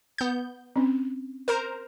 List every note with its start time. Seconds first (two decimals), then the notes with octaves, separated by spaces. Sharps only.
0.18 B3 G6
0.76 C4 C#4
1.48 A#4 C5 A#5